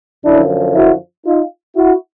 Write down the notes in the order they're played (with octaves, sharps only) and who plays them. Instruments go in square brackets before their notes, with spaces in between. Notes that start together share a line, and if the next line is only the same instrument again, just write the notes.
[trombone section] F#2 D3 F3 D4 E4
E4 F#4
D#4 F4
E4 F#4